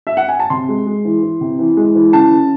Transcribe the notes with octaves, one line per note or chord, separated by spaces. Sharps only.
E5
F#5
G#5
A5
C3 C6
G#3
G#3
E3
E3
C3
E3
G#3
E3
C#3 A5
C#3